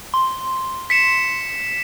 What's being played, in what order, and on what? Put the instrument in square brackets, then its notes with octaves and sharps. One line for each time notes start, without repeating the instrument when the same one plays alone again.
[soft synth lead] C6
[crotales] B6 C#7 E7